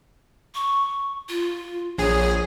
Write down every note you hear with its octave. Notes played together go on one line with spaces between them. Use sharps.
C#6
F4
A#1 G#4 C#5